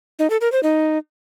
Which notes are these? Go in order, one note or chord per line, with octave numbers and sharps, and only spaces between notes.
D#4
A4
A#4
C5
D#4